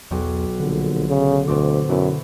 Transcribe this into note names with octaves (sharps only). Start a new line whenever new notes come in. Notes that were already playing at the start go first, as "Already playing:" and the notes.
B1 E2 F#4 G5
A#1 D3
C#3
D2 B2 C4 D6
F#2 B2 E4 B4